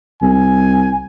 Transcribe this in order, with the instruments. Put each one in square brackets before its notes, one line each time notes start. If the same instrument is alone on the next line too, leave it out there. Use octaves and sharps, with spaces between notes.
[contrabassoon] C2 [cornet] G#5